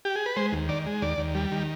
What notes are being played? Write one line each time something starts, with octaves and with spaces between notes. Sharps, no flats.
G4
G#4
B4
G#3 C5
D#2
D#3 D5
G#3
D#2 D5
D#2
G3
D#3